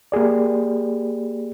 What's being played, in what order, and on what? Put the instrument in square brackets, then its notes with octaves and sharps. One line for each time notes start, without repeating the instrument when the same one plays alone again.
[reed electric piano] A#3 G4 G#4 D5